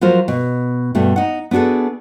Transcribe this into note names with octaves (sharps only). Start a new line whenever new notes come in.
F3 F#3 F4 A#4 C5
B2
G2 B2 A3
D#4 F#5
B3 D4 F#4 G#4 A4